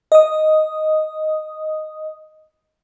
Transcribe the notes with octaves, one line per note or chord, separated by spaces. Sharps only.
D#5 D#6